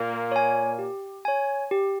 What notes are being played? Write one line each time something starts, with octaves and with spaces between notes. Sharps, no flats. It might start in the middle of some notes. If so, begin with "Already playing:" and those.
Already playing: A#2 A#3
C#5 G#5
G4
C#5 G#5
G4